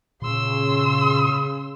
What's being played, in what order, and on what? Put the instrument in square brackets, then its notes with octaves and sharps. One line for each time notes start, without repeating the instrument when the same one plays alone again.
[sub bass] A#2 [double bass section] C#3 [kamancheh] C6 E6